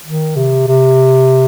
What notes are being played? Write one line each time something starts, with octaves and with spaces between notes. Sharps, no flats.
D#3
C3
C3